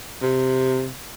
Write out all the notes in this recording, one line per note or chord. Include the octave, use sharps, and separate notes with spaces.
C3